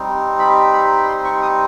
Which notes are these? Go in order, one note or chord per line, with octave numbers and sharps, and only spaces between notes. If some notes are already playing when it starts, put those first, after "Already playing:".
Already playing: G3 C4 D#4
B5
B5
B5
C6
C#6
D#6